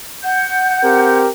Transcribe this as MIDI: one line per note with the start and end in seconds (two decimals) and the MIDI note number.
0.23 1.19 78
0.23 1.19 91
0.84 1.30 60
0.84 1.30 67
0.84 1.30 70